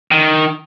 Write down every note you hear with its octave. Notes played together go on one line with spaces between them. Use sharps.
D#3